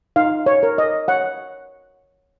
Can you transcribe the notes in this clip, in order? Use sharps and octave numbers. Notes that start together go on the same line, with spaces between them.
D#4 F5
C#5
A#4
D#5
C#5 F#5